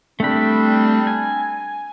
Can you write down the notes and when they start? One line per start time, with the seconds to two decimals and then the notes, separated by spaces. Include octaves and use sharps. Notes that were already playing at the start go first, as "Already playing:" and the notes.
0.20 G3 A3 C4 D4 B5
1.07 G#5